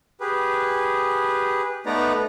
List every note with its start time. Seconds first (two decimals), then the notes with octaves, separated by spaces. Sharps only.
0.21 G4 G#4 B4
1.86 A3 B3 D#4 B4 D5 A#5